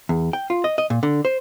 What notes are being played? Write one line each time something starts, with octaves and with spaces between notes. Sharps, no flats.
E2
G5
F4
D#5
D#5
A#2
D3
C5